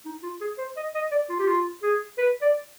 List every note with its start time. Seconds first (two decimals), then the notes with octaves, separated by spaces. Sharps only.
0.05 D#4
0.23 F4
0.41 G#4
0.58 C5
0.77 D#5
0.95 D#5
1.12 D5
1.29 F4
1.39 G4
1.48 F4
1.83 G#4
2.18 B4
2.42 D5